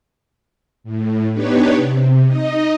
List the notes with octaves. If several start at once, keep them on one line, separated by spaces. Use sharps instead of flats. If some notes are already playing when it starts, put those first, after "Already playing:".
A2
B3 D4 D#4 G4 B4 C#5
C3
D#4 D#5